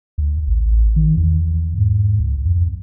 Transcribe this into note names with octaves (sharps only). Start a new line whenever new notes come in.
D2
A1
D#3
E2
G#2
C#2
F2